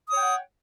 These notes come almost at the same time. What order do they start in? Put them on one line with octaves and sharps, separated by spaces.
D#6 C#5 G5 F#5